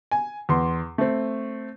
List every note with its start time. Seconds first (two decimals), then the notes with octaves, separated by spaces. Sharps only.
0.11 G#5
0.49 E2 C6
0.98 A3 C4